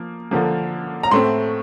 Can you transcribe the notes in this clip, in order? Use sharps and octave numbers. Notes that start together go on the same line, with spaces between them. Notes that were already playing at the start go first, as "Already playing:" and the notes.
Already playing: F3 A#3
D3 F3 A#3
A#5
A2 A3 C4 C6